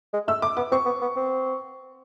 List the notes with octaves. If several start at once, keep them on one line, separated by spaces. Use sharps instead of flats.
G#3
A3 E6
A3 D6
B3 D6
C4 C#6
B3
B3
C4